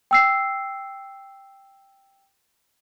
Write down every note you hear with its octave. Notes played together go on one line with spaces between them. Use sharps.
G5 E6 C7